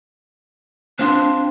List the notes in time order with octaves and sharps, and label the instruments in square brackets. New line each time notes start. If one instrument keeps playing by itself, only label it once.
[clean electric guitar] C4 F4 C5 [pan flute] D4